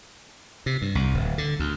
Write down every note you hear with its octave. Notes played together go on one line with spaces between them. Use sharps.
C3
G2
C2
D1
D3
D2